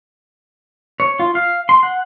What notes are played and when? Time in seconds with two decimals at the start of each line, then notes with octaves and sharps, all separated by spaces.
1.00 C#5
1.20 F4
1.35 F5
1.69 C6
1.83 F#5